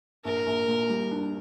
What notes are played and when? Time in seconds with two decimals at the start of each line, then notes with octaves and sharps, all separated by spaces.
0.24 A#1 A#4
0.46 A#1
0.68 A#2
0.90 G3
1.11 D4